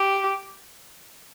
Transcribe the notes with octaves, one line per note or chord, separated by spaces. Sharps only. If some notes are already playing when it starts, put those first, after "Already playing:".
Already playing: G4